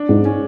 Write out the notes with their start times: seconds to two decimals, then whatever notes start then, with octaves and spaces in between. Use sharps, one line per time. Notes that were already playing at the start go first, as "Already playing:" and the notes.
Already playing: D4
0.09 G#2
0.25 C#4